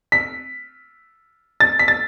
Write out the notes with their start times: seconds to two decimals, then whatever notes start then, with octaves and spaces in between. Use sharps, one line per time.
0.12 B6
1.60 A6
1.79 B6
1.88 A6